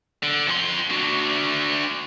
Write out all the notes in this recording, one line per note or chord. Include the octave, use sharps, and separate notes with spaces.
D3
F2 C6
D3 F#4